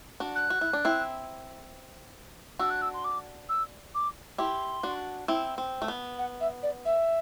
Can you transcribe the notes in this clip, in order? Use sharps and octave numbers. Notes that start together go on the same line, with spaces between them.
D4 F#4
F#6
F#4
E4
D4
C4 E4
D4 F#4 E6
F#6
E6
C6
D6
E6
D6
E4 G4 C6
D4 F#4
C4 E4
C4
A3
B3
F#5
E5
D5
E5